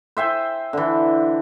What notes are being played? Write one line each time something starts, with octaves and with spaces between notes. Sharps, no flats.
C5 E5 G5 G#5
D3 E3